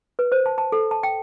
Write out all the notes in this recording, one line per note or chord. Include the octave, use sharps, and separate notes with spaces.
B4
C5
A5
A5
A4
A5
G5